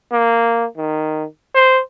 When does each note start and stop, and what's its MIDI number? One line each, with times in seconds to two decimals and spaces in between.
0.12 0.65 58
0.77 1.24 51
1.55 1.81 72